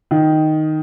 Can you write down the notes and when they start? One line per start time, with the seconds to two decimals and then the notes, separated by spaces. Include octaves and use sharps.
0.11 D#3